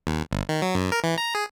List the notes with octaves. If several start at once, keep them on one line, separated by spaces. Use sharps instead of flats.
D#2
G1
D#3
F#3
F#2
A#4
E3
A#5
G#4